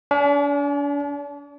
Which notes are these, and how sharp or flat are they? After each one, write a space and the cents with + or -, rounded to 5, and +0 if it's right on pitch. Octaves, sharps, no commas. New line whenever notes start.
D4 -40 G#5 +30